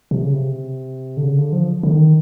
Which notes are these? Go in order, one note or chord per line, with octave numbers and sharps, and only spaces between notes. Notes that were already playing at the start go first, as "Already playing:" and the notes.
C3
C#3
C3
D3
C#3
D3
F3
D3
D#3